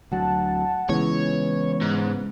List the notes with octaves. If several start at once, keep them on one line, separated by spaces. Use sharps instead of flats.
D2 F#3 F#5 A5
C#3 E3 G#3 B3 C#5
G#2